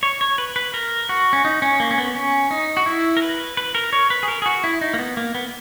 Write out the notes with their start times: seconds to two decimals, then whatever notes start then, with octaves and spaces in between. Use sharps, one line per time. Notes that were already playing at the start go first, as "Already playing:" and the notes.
0.03 C#5
0.21 C#5
0.38 B4
0.56 B4
0.74 A#4
1.09 F#4
1.33 C#4
1.45 D#4
1.62 C#4
1.80 A#3
1.91 C#4
1.98 B3
2.15 C#4
2.51 D#4
2.77 F#4
2.86 E4
3.17 A#4
3.22 B4
3.57 B4
3.75 A#4
3.93 C#5
4.10 B4
4.23 G#4
4.28 A#4
4.42 G#4
4.46 F#4
4.64 E4
4.81 D#4
4.94 A#3
4.99 B3
5.17 A#3
5.35 B3